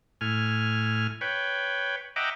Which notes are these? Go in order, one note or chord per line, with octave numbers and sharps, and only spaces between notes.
A2 G#5 F6
B4 C#5 G5
D#5 E5 F#5 G5 A#5 D6